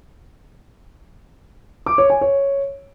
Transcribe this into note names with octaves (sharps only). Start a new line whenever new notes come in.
D6
C#5
G#5
C#5